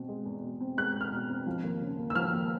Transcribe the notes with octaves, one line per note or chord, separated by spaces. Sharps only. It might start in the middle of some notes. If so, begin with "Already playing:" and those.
Already playing: B2 C4
G#3
E2
B2
C4
G#3 F#6
E2
F6
B2
C4
F3
D#2
C#3
D#2
E6
F3 F6
D#2